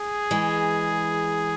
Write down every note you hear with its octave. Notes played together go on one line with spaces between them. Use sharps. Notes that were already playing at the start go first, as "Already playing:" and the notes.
Already playing: G#4
E3 G#3